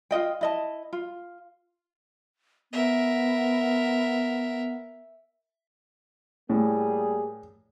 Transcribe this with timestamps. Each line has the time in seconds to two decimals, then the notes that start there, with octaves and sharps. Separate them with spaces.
0.11 F4 F#4 D#5 G5
0.41 E4 D#5 A5
0.93 F4
2.73 B3 A#4 E5
6.49 A2 G3 A#3 G#4